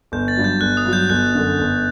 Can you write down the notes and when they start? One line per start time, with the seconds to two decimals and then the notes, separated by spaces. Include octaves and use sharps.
0.12 G1 G6
0.28 A6
0.37 G2 F#3
0.44 G6
0.61 G1 F#6
0.77 D#6
0.85 G2 F#3
0.93 G6
1.09 G1 F#6
1.35 F#2 D3
1.59 G1